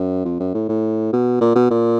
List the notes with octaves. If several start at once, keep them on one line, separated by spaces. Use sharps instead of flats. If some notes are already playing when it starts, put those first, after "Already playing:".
Already playing: F#2
F2
F#2
A2
A2
B2
A#2
B2
A#2